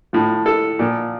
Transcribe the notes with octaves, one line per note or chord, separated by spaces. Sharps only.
A2 F3
A4
A#2 F3